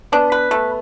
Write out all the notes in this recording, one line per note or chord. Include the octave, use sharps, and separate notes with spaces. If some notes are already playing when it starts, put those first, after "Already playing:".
B3 D4
B4
A3